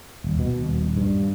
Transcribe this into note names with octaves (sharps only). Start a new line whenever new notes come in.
D#1
B2
D#1
G2